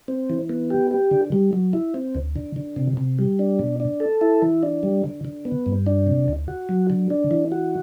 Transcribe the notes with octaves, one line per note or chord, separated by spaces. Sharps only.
C4
E3
B3
G4
G4
D3
G3
F#3
E4
C4
D2
D3
D3
C3
C3
G3
D4
B2
D4
A4
E4
E3
D4
G3
D3
D3
B3
G2
D4
C3
D2
F#4
F#3
D3
D4
E3
F#4